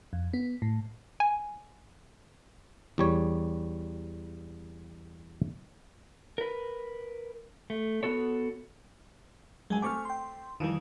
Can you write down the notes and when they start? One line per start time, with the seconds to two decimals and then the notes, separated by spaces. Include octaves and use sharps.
0.13 F2
0.33 B3
0.62 A2
1.20 G#5
2.98 E2 G3 C#5
6.38 A#4 B4
7.70 A3
8.03 B3 F#4 A4 C#5
9.70 F#2 G#3 G#5
9.82 A3 C4 G#5 C#6 D6 F6
10.05 G5 C6
10.60 F2 D#3 E3 G3